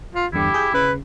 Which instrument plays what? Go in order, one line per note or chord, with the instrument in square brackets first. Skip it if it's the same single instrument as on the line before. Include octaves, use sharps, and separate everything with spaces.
[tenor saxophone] F4
[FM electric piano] E2 G2 D3 [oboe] E4 [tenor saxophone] G4
[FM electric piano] G#4 G6
[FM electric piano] C#3 [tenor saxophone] B4